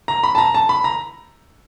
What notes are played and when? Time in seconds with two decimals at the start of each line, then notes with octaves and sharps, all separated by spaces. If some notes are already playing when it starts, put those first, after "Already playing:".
0.08 A#5
0.24 B5
0.35 A5
0.38 A#5
0.54 A5
0.69 B5
0.84 A#5